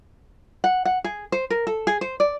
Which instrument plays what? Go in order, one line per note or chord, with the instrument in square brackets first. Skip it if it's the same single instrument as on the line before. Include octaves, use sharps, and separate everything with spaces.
[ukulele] F#5
F#5
G#4
C5
A#4
A4
G#4
C5
D5